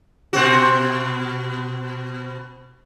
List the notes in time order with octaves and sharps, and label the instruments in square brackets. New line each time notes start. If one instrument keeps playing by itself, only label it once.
[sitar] B2 C4 F#4